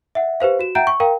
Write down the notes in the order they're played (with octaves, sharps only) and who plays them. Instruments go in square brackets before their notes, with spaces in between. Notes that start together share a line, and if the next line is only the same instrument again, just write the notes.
[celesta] E5 F#5
G4 B4 C5 F5
F#4 E7
E5 F#5 G5 A#5 G6 D7
C#6
A#4 F5 G5 A#5